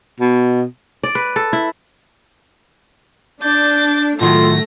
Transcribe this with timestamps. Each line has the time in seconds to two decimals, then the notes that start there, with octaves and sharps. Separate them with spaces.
0.20 B2
1.03 D5
1.15 B4
1.36 A4
1.53 E4
3.43 D4 G6 A6
4.21 A2 D#3 F#3 A3 F4 A#6